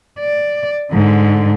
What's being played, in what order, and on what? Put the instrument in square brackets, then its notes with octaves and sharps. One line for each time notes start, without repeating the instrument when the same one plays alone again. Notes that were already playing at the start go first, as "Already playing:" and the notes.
[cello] D5
G#2 D3